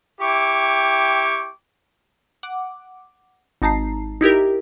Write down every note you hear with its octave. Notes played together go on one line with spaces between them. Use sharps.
E4 G4 G5 C#6 D6
F#5 D6
G#1 D#4 A5 A#5 C7
D#4 E4 G4 A#4